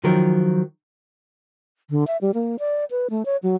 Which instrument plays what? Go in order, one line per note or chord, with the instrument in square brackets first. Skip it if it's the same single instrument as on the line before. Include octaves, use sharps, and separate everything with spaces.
[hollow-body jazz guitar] D#3 F3 F#3 A#4
[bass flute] D3
E5
G3
A#3
D5
B4
A3
C#5
F#3